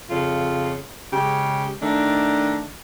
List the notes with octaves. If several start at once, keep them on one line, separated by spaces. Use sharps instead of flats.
F2 C#3 F4
C#3 G#3 G4
D#3 A3 D4